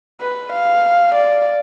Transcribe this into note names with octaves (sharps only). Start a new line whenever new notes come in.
B4
F5
D5